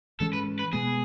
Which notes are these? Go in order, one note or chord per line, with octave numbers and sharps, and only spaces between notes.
G#2 E3 G#3 C#4 A4
B4
B4
B2 G#3 B3 G#4